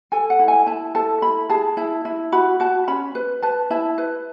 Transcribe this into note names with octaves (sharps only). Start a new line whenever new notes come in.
A4 G#5
F#5
E4
G#5
E4 A5
A4 A5
E4 B5
G#4 A5
E4 A5
E4
F#4 B5
F#4 A5
C#4 B5
B4
B4 A5
E4 A5
B4